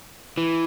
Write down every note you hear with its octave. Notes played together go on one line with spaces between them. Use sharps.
E3